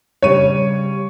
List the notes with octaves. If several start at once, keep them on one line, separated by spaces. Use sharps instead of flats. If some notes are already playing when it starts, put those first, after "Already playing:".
C#3 G3 C#5 D#7